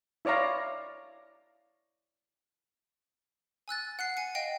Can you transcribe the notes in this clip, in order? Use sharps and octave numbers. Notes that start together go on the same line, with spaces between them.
E4 C#5 D5 F5 A#5
G#5 E6 F#6 A6
F#5 F#6 C7
G#5 C#7
D#5 F5 G5 C7